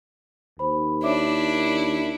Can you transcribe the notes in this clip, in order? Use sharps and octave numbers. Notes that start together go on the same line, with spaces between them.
D#2 C5 B5
D4 E4 C#5 E5 D6